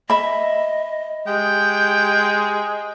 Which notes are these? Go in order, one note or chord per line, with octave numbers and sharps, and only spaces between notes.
D#5 E5 B5
G#3 G4 G5